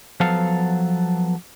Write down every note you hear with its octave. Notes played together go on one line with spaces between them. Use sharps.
F3 F#3 B3 A4 F5